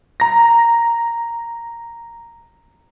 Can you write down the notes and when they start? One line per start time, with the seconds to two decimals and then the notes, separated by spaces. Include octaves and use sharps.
0.20 A#5 A#6